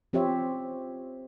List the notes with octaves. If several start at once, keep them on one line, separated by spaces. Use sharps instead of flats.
F3 C4 G4 C5 C#5 E5